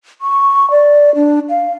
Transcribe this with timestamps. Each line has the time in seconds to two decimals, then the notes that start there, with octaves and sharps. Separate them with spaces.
0.21 C#6
0.71 D5
1.15 D4
1.50 F5